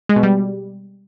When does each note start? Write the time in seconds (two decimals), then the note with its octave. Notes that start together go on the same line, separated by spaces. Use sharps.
0.09 G#3
0.16 B2
0.23 G3